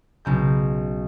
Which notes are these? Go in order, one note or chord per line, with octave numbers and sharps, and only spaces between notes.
B1 C#3 G6